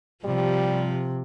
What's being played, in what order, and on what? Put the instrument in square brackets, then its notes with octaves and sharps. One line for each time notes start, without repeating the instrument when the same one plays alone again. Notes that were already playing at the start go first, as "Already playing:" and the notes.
[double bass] C3 [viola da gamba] F3 [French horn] G3